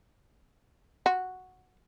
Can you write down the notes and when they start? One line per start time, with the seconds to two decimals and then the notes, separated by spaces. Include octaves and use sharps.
1.06 F#4